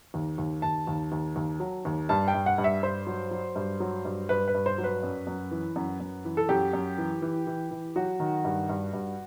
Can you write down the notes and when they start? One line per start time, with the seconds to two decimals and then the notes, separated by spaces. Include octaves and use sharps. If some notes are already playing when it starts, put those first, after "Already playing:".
0.14 D#2
0.38 D#2
0.62 D#2 A5
0.87 D#2
1.12 D#2
1.36 D#2
1.60 F#3
1.85 D#2
2.09 G2 A5
2.28 G5
2.34 G2
2.46 F#5
2.58 G2
2.64 E5
2.83 G2 C5
3.07 F#3
3.31 F#3
3.56 G2
3.80 F#3
4.05 G2
4.29 G2 B4
4.48 B4
4.54 G2
4.66 C5
4.78 F#3
4.84 B4
5.03 F#2
5.27 F#2
5.51 E3
5.76 F#2
6.00 F#2
6.25 E3
6.37 A4
6.49 F#2 G4
6.73 F#2
6.98 E3
7.22 E3
7.47 E3
7.71 E3
7.96 F#3 F#4
8.20 D#3
8.44 G2
8.69 G2
8.93 G2